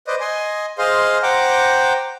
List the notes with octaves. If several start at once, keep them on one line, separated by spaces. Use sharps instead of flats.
B4 C5 D5 D#5
D#5 G#5 C6
G#4 C5 D#5 F5 C6
C5 F#5 G5 A#5 D6